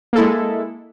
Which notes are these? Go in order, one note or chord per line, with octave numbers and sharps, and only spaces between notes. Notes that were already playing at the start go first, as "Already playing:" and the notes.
G#3 A#3 E4 A4